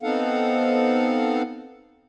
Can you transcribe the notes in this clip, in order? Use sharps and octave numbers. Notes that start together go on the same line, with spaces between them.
B3 C4 D#4 A4 F5 F#5